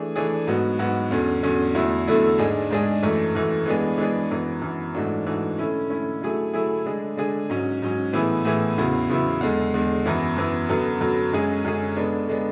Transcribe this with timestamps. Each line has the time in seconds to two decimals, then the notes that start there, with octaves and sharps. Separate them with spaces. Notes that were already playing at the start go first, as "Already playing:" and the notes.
Already playing: E3 A3 D4 G#4
0.16 E3 A3 D4 G#4
0.47 G#2 F#3 B3 F#4
0.79 G#2 F#3 B3 F#4
1.11 E2 D3 F#3 C#4
1.43 E2 D3 F#3 C#4
1.74 E2 D3 F#3 A3 E4
2.08 E2 D3 F#3 A3 E4
2.38 G#2 G#3 D4 G#4
2.71 G#2 G#3 D4 G#4
3.03 F#2 E3 A3
3.35 F#2 E3 A3
3.66 E3 G#3 B3 D4 G#4
3.98 E3 G#3 B3 D4 G#4
4.31 F#2 E3 B3
4.62 F#2 E3 B3
4.94 G#2 E3 A3 D4 F#4
5.26 G#2 E3 A3 D4 F#4
5.58 D3 A3 C#4 E4
5.90 D3 A3 C#4 E4
6.21 D3 F#3 A3 E4 G#4
6.53 D3 F#3 A3 E4 G#4
6.86 D3 G#3 D4 G#4
7.17 D3 G#3 D4 G#4
7.50 G#2 F#3 C#4
7.82 G#2 F#3 C#4
8.13 A2 E3 B3 E4 G#4
8.45 A2 E3 B3 E4 G#4
8.78 E2 C#3 F#3 B3 E4
9.09 E2 C#3 F#3 B3 E4
9.41 E2 D3 G#3
9.74 E2 D3 G#3
10.06 F#2 E3 B3 E4
10.37 F#2 E3 B3 E4
10.69 F#2 D3 F#3 B3
11.00 F#2 D3 F#3 B3
11.33 F#2 D3 G#3 C#4 G#4
11.65 F#2 D3 G#3 C#4 G#4
11.97 D3 G#3 B3 D4
12.28 D3 G#3 B3 D4